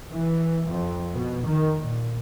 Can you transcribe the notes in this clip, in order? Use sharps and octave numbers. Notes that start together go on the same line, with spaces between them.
E3
F2
B2
D#3
A#2